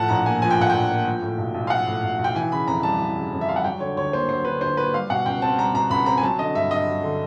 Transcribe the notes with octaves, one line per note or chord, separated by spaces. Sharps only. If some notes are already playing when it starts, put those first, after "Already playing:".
Already playing: A2 F3 F#5 A5
A#1 A#5
A#3 G#5
F3 G#5
G5
A2 F#5
A#1 G5
A#3
F3
A2
B1
B1
F5
F3 F#5
A2
B1
B1
G5
E3 G#5
C#3 B5
F2 A#5
G3 A5
E3
C#3
F2
E5
G3 F5
F#5
F#3 G5
D3 C#5
D2 C#5
A#3 C5
F#3 C5
D3 B4
D2 C5
A#3 B4
G3 F5
B2 F#5
C#2 G5
C4 A5
G3 A#5
B2 A#5
C#2 B5
C4 A#5
G#5
F#3 A5
D3 D#5
G2 E5
G2 D#5
F#3
D3